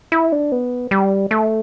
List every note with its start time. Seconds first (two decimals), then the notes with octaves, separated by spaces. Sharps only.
0.12 E4
0.32 D4
0.52 B3
0.91 G3
1.31 A3